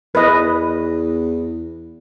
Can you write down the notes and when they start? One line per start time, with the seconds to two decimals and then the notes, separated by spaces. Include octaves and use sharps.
0.15 E2 B4 D#5